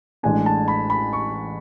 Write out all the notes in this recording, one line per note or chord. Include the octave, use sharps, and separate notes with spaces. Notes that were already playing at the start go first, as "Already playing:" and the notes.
A1 A2 G#3 D4 G#5
A5
B5
B5
C#6